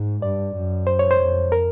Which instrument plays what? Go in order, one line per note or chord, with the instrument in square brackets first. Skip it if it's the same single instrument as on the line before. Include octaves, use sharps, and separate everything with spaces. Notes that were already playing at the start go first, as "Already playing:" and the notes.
Already playing: [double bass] G#2
[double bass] G2 [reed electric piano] D5
[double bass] F#2
[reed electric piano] C5
C#5
C5
[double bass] F2
[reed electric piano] A#4